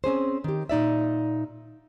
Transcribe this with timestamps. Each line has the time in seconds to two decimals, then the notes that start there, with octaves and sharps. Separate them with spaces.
0.04 C4 C#4 G#4 C5
0.44 D#3 G4
0.69 A#2 D#4 D5 E5